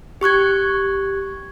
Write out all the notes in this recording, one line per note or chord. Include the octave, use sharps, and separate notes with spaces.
G4 C#6 F#6 G#6